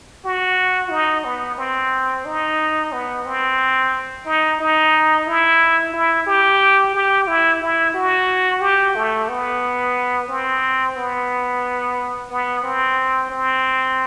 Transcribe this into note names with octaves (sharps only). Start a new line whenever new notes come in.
F#4
D#4
B3
C4
D#4
B3
C4
D#4
D#4
E4
E4
G4
G4
E4
E4
F#4
G4
A3
B3
C4
B3
B3
C4
C4